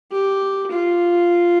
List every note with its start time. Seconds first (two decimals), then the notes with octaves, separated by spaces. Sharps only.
0.12 G4
0.71 F4